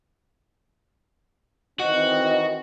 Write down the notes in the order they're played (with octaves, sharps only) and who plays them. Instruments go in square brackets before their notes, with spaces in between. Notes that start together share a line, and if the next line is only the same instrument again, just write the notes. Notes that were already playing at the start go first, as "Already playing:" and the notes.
[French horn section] D#3 E3 C4 [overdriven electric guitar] F#4 [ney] D#5